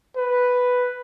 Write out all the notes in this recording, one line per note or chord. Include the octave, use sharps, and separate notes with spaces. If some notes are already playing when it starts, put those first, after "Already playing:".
B4